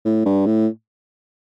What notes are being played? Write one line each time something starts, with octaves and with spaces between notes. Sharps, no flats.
A2
G2
A2